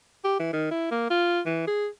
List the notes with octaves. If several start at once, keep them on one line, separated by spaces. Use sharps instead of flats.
G4
E3
D#3
E4
A#3
F4
E3
G#4